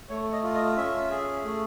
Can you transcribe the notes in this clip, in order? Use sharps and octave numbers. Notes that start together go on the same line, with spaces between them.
A3 C#5
D#5
F4
D#5
C#4 E5
G#4
A3